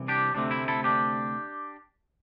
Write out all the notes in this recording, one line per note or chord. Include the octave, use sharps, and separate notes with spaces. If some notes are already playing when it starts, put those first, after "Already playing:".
Already playing: C2 C3 E3
D4 G4
D2 C3 A3 C4 D4
E4
E4 A4
D4 G4